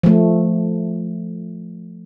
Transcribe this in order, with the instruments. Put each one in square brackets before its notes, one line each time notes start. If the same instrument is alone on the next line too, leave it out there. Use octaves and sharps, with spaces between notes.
[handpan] F3 A3